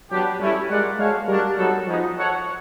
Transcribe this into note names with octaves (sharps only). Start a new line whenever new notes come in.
F#3 B3 D4 G4
G3 A3 C#4 E4
G#3 F4 A#4 D5 F#5
G#3 F#4 A4 C#5 F5
G3 D4 F#4 A#4
F#3 G3 B3 D#4 F#4 A4
F3 G#3 B3 D#4
F#4 A4 C#5 F#5